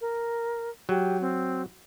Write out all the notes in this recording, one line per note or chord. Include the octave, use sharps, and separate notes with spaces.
A#4
F#3 G4
C4